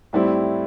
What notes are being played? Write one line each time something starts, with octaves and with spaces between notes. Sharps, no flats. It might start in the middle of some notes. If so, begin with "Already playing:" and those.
A2 G3 C4 E4